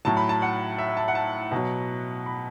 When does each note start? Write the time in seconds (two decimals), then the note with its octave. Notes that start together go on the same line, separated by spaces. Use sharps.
0.05 A2 F#3 A5
0.17 B5
0.29 A5
0.42 F#5
0.78 E5
0.97 A5
1.08 F#5
1.15 A5
1.51 B2 F#3 F#5
2.26 B5